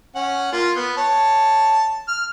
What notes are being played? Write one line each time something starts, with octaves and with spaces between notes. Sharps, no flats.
C#4 F#5
A#3 F4
B3
C#5 A5
F6